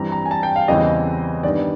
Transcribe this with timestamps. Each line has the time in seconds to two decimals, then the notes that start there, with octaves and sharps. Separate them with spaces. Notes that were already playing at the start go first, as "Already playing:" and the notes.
Already playing: G2 E3 G3 C4 A#5
0.12 A#5
0.26 G#5
0.31 A5
0.43 G5
0.56 F5
0.68 E2 C#3 E3 G3 C4 D#5
1.43 G2 D#3 G3 B3 D4 D5